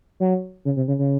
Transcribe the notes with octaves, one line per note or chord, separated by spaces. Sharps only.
F#3
C#3
C3
C#3
C#3